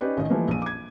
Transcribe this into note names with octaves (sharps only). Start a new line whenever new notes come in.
C#4 D#4 G4 B4 D5
A1 D#3 D#5
E3 F3 G3 A3 A#3
A#1 D#7
D6 G#6